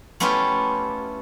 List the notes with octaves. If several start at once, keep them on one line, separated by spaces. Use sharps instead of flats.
A3 B3 C#4 E4 F4 G4